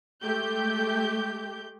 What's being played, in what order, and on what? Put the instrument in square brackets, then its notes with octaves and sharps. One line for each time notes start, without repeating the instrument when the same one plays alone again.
[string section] G#3 A3 G4 G6